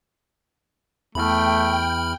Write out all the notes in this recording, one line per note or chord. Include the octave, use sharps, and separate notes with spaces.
E2 A3 G5 B5 F6